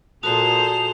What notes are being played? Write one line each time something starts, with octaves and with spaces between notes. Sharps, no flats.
A#2 F#4 G#4 A4 C5 A5 D#6 F7